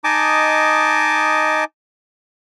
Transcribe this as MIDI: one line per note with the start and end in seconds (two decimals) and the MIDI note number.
0.04 1.64 63
0.04 1.64 75
0.04 1.64 80
0.04 1.64 81
0.04 1.64 86